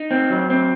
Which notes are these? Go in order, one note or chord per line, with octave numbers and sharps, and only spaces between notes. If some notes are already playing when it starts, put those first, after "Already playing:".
Already playing: D#4
C4
F#3
C4